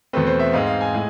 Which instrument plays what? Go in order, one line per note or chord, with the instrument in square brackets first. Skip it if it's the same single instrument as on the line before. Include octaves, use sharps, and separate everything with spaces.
[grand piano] E2 B2 A3 C4 B4
C5
E5
G#2 G#3 C4 F5
F5
G#5
A2 G#3